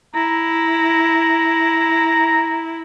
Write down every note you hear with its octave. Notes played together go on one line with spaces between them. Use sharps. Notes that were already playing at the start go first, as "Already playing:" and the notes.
E4 A#5